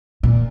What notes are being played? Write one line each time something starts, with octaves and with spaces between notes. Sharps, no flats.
A#2